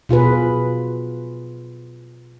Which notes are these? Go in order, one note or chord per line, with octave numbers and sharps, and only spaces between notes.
B2 F4 G#4 B4